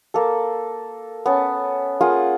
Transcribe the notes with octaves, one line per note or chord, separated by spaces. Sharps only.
A#3 A4
B3 C#4 A5
A#3 F4 G#4 F#5